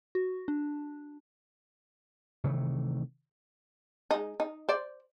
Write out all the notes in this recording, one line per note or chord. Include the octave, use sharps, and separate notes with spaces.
F#4
D4
C3 D#3 E3 A3
G#3 D#4
D#4
C5 D5